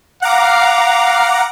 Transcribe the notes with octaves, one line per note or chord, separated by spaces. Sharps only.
F5 F#5 A#5 D6